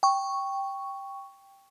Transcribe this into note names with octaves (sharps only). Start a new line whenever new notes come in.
G5 C#6